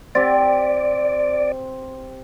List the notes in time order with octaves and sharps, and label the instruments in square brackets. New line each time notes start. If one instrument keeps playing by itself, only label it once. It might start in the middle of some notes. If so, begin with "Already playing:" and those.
[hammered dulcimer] C4 G4 [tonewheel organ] D5